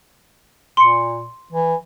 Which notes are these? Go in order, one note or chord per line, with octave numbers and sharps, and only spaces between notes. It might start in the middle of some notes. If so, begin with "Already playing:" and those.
A#2 C6 C#7
E3